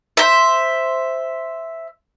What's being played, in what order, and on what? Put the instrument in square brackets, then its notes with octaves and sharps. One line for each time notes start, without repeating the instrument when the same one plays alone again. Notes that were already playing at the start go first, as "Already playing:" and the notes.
[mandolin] C5 E5